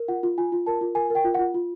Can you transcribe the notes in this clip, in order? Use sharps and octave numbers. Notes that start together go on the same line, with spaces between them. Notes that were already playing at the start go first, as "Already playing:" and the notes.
Already playing: A#4
F4 F#5
F4
F4 G#5
F4
A#4 A5
F4
A#4 G#5
A#4
G5
F4
F#5
F4
F4